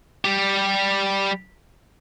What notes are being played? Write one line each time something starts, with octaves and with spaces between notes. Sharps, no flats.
G3 G4